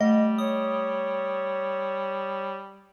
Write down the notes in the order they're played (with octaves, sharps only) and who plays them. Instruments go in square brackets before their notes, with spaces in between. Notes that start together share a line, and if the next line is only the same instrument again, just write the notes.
[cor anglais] G3 [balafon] A3 [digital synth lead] D#5
[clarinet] C#5 [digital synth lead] D#6